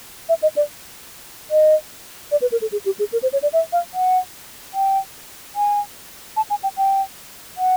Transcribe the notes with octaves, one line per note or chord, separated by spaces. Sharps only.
E5
D#5
D5
D#5
D5
B4
A#4
A4
G#4
G4
G#4
A#4
C5
C#5
D5
E5
F5
F#5
G5
G#5
A5
G#5
G5
G5
F#5